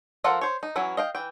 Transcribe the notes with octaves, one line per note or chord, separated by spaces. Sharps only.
F3 F4 A4 A#4 F#5
C5 C#5
D#4
E3 F#3 C#4 E4
D#5 F5 G5
E3 G5